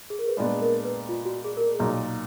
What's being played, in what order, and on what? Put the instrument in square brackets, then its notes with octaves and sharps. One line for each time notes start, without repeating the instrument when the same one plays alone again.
[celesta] G#4
A#4
B4
[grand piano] A#2 G#3 B3 D4 [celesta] D5
[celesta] A#4
B4
F4
F#4
G#4
A#4
G#4
[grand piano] B1 A#2 F#3